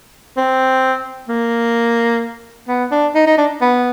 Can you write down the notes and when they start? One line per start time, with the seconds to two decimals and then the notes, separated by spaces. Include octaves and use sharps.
0.37 C4
1.29 A#3
2.68 B3
2.91 D4
3.15 D#4
3.27 D#4
3.38 D4
3.61 B3